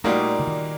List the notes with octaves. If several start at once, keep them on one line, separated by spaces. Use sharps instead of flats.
A#2 G3 A3 A#3 D#4 F#4
D3
D#3